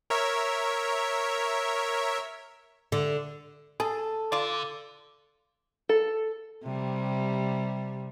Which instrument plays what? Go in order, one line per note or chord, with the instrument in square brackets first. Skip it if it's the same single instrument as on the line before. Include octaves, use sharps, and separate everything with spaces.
[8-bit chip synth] A#4 C#5 E5
[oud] D3
[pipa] G#4 [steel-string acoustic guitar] A4
[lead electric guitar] D3 [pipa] F4 D5
[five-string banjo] A4
[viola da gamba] C3 G3